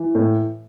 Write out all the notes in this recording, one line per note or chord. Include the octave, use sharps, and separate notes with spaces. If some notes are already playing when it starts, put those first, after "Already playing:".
Already playing: E3
A2